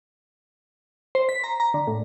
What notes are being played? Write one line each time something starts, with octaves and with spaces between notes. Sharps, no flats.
C5
B6
A#5
A#5
D3
A2